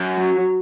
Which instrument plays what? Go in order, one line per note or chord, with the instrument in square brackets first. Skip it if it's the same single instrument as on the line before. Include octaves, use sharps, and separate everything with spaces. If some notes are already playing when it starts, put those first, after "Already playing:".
Already playing: [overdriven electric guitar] F#2
[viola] F#3